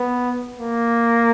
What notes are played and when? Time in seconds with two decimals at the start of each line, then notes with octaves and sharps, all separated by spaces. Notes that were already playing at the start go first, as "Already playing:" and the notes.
Already playing: B3
0.58 A#3